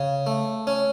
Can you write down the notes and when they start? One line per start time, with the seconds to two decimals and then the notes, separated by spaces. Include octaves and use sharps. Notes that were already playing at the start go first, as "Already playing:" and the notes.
Already playing: C#3
0.27 A3
0.67 C#4